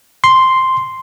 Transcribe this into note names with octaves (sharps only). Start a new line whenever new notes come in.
C6